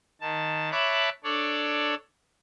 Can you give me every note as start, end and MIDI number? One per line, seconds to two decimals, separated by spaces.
0.21 0.71 51
0.21 0.71 81
0.72 1.09 73
0.72 1.09 76
0.72 1.09 81
0.72 1.09 83
0.72 1.09 86
0.72 1.09 90
1.24 1.95 62
1.24 1.95 69
1.24 1.95 73
1.24 1.95 74